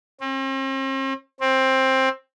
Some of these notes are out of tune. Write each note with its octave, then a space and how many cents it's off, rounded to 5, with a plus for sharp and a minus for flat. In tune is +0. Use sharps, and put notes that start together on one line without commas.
C4 +45
C4 +15